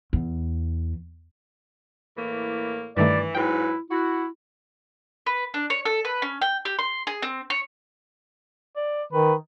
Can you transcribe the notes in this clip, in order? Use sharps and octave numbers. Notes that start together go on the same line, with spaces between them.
E2
A2 E3 A#3
G2 D#3 E3 A3 D5
G#2 F#3 E4 B4 G5
E4 F#4
B4
D4
C#5
A4
B4
C#4
G5
G4
C6
G#4
C4
C#5
D5
D#3 B4